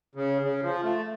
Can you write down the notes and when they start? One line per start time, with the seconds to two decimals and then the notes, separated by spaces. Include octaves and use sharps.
0.15 C#3
0.42 C#3
0.63 F3
0.83 A3